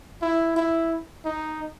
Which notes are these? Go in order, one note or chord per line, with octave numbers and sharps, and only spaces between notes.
E4
E4
D#4